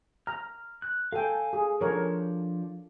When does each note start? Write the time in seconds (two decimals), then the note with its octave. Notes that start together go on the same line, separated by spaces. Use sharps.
0.27 A#5 F6
0.82 F#6
1.13 A4 F5 G5 G#5
1.53 G#4
1.81 F3 D4 A4 A#4 C#5